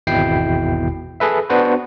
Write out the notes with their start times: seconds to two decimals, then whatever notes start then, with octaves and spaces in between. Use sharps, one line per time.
0.07 G#1 E2 B2 E4 G5 C7
1.20 G#4 A4 B4 E5
1.50 B3 D4 F#4 B4 C5